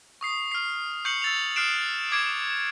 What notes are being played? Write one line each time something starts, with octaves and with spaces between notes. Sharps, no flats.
C#6 D#6 C7
F6 C7
C#6 G6 C7 C#7 F#7
E6 A6 F7
D#6 F6 F#6 C7 D7 E7
D6 G#6 C7 D7